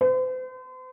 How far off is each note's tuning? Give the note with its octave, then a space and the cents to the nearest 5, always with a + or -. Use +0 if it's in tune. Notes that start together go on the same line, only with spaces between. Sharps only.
C5 -40